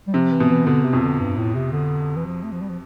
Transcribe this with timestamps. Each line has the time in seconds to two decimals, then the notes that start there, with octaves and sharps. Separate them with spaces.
0.07 G3
0.14 C3 F3
0.32 E3
0.40 B2
0.49 E3
0.66 B2 D3
0.84 C3
0.93 F2
1.03 D3
1.19 G2
1.37 A2
1.55 C3
1.72 D3
2.16 E3
2.26 F3
2.43 A3
2.52 F3
2.61 G3
2.69 F3